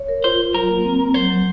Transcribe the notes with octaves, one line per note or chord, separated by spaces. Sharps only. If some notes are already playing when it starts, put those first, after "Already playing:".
Already playing: C#5
A#4
F4 C5
F4
F#3 A#4
A#3
C4
C4
F#3 C5
F#3